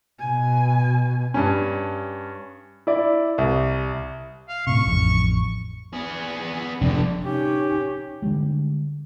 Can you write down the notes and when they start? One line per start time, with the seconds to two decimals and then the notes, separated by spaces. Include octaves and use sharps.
0.19 B2 G#5
1.34 G2 C#4
2.87 E4 D5
3.38 C2
4.49 F5
4.67 A2 C3 C#6
4.86 A1 F2
5.93 B3 G#4
6.81 F1 G2 D3
7.25 C3 C#4 D#4 G4
8.22 D3 D#3 G3 G#3